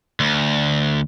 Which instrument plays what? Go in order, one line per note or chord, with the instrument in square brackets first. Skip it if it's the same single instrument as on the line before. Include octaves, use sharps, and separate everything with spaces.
[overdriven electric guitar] D2